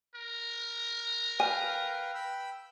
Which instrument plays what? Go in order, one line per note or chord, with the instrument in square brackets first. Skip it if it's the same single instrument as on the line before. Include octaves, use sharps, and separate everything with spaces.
[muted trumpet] A#4
[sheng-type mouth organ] B4 F5 G5 [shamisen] G#5
[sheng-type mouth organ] G5 B5 E6